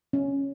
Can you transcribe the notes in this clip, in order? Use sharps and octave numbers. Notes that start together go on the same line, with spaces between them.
C#4